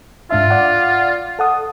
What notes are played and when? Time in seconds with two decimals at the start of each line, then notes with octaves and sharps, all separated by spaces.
0.31 G#2 D4 F4 E5
0.50 D5 F#5
1.39 A4 F#5 D#6